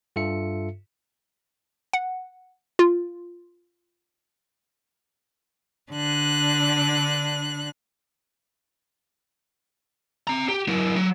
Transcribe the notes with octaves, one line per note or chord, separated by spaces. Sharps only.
G2 F4 A4 E5 C#7
F#5
F4
D3 D4 F#6
C4 A#5
G4
F#3 E4
F#3